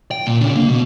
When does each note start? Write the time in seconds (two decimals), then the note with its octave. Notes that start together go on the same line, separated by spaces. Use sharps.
0.11 G5
0.27 A#2
0.41 C#3 D4
0.56 A#3 F5
0.68 B2